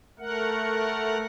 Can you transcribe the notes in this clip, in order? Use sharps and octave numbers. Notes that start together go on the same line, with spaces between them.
A3 A#4 F#5